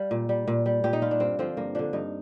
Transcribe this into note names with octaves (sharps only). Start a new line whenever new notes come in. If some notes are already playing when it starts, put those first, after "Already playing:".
Already playing: G3 F5
A#2
G3
A#2
G3
A#2 G4
D#4
G3 F4
D4
G2 C4
D3 F3 C4
G2 A#3
D3 F3 D4
G2 D#4